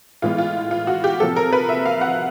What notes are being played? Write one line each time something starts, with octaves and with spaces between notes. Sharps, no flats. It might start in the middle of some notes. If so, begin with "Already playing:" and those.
A2 E3 G#3 B3 F4
F4
F4
F#4
G4
C3 F3 A#3 A4
A#4
B4
E5
F5
F#5